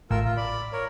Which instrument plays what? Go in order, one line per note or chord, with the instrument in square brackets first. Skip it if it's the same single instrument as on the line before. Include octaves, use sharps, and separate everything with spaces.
[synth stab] A1 A2 [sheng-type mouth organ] F4 A#4 E6
[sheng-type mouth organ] F4
D5 B5
A#4 C#5